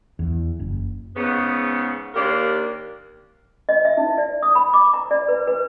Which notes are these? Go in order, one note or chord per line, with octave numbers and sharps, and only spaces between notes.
E2
F#1
G#2 C#3 B3
D#2 A#3 D4 G4 A#4
D#5
E5
D#4
D5
D#6
B5
D6
A#5
D5
B4
B4